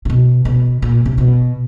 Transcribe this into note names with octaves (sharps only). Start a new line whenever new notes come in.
C3
B2
B2
A#2
C3
B2